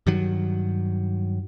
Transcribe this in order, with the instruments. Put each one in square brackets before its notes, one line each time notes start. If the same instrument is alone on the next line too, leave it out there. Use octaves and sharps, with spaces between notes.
[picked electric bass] G2 D#3 F#3